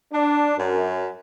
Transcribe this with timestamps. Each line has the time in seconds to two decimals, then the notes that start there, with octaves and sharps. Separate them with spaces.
0.12 D4
0.57 F#2